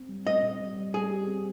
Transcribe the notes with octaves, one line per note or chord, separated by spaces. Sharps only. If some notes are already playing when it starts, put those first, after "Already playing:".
Already playing: C4
G3
C4 D#5
A#2
G3
G3
G3 G#4
G4
C4